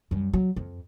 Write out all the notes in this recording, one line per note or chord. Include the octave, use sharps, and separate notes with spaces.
F#2 G3
F#3
F2